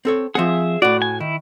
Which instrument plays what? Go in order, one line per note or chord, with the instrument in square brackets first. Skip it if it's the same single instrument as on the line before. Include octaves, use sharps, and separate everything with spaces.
[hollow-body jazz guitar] C4 A4 C#5
[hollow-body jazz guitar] F3 C4 F#5 [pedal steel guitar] G#4 E5
[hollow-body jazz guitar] A2 F#4 [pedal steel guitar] D5
[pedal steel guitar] G#5
[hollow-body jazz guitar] D#3 [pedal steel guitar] E4